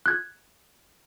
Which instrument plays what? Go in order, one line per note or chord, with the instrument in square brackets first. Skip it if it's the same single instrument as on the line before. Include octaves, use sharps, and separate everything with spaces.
[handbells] F#6 G#6